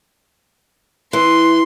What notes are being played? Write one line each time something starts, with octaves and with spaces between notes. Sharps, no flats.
E3 C6